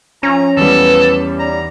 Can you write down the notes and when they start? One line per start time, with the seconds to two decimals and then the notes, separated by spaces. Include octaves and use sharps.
0.23 F3 C#4 A#5
0.57 E2 F3 G3 A4 B4
1.39 D#4 C#5 D5 A#5